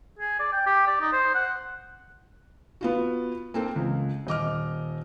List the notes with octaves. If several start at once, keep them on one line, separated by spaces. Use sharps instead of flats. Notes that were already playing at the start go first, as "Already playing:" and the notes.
G#4
D5
G5
G4
D5
D#4
C5
F#5
B3 F4 F#4
A#3 C4 A4
C#2
D#1 D#5 D6 F6